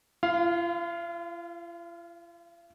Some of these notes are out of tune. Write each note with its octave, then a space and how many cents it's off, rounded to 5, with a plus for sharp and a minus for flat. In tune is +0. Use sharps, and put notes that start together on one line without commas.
F4 -45 F5 +0